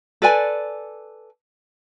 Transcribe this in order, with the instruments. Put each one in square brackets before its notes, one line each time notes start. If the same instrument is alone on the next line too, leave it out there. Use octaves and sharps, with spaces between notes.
[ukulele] A4 B4 D5 G#5